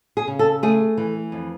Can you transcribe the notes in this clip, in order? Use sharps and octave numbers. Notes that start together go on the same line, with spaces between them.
G#4
C#3
A4
A3 G#4
E3
F2